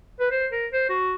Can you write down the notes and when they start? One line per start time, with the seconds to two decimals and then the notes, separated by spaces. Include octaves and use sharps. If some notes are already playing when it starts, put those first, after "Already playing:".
0.20 B4
0.31 C5
0.52 A#4
0.73 C5
0.89 F#4